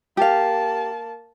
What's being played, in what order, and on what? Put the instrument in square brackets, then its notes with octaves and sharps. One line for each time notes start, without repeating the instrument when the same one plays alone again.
[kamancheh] A#3 A5 [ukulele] G4 F5